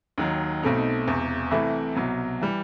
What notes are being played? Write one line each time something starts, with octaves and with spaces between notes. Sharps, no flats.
D#2 D#3 F#3
B1 B2 A3 C4 D#4
E1 E2 C3
C2 C3 E3 A3 E4
C2 B2 F#3
E3 G3